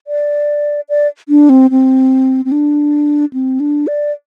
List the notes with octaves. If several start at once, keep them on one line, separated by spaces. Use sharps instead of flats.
D5
D5
D4
C4
C4
C4
D4
C4
D4
D5